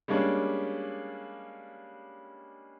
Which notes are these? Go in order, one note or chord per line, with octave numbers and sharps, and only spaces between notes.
G3 G#3 A#3 C#4 D4